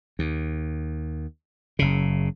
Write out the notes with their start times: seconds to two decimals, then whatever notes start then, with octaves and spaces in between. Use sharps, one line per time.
0.19 D#2
1.79 F#1 C#3